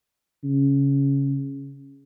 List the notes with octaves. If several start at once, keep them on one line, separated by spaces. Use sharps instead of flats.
C#3